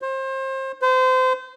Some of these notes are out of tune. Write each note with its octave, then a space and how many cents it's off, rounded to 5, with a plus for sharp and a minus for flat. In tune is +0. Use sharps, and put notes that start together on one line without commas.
C5 +30
C5 -30